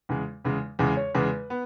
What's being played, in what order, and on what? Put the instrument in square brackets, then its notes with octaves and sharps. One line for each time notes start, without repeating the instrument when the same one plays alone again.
[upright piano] E2 C#3 G#3
E2 C#3 G#3
[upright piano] E2 C#3 G#3 [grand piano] G#4
[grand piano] C#5
[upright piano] E2 C#3 G#3 [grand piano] B4
[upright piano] B3